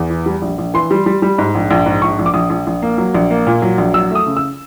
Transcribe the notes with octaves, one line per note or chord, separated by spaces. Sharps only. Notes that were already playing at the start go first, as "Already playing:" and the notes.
Already playing: E2
E3
G3
A#1
A#1
E3 C6
G3
G3
G3
G#2
A#1
A#1
G#2
A#1 C#6
A#1
D6
A#1 D#6
A#1
A#1
A#3
F#3
A#1
A#3
A#2
F#3
A#1
F#3 E6
A3 D#6
C#3
E6